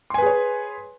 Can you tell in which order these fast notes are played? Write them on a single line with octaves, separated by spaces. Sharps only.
C6 G#5 B4 G#4 C#5